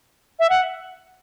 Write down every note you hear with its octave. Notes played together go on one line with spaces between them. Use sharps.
E5
F#5